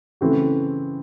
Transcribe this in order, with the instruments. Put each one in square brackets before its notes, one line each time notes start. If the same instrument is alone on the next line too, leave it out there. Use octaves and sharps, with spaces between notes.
[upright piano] C#3 E3 A3 C4 F#4